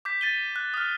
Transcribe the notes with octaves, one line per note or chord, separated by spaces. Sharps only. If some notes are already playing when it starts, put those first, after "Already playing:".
D6 G6 B6
A6 D#7 G7
F#6
D#6 F6